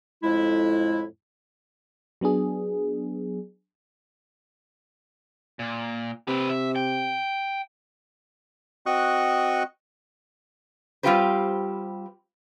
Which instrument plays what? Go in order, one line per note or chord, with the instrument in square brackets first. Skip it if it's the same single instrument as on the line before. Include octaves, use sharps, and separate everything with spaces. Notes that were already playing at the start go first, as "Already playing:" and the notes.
[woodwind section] F2 A2 G#3 E4
[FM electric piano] F#3 B3 D4 G#4
[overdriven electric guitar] A#2
[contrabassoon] C3 [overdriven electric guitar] C4 B4
[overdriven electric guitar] E5
G5
[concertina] C4 F#4 D#5 C#6 D#6 F#6
[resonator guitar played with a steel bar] G3 C4 F4 G4 B4 C5